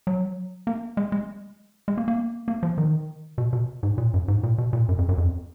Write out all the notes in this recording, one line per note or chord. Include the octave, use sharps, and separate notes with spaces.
F#3
A#3
G#3
G#3
G#3
A#3
A#3
A#3
F3
D#3
B2
B2
G#2
A#2
F#2
G#2
A#2
B2
A#2
F#2
F2
F#2
F2